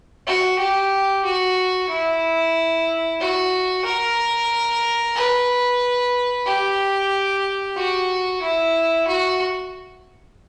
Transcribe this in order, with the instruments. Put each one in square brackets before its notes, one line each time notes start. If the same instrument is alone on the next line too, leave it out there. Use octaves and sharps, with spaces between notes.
[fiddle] F#4
G4
F#4
E4
F#4
A#4
B4
G4
F#4
E4
F#4